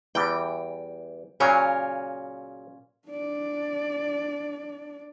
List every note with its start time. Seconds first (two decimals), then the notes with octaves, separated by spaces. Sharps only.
0.15 E2 E3 G3 G5
1.40 A#2 C#3 F#3 C#4 A#4 F5
3.08 D4 D5